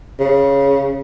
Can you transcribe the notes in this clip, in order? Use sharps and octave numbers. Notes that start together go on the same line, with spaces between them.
C#3